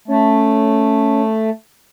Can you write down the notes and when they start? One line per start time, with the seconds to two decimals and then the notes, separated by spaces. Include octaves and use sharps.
0.08 A3 C#4